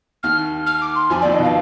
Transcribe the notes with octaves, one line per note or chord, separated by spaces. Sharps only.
D#2 D#3 F6
F6
D6
C6
F2 F3 G#5
D5
D#2 D#3
D#5
B2 F5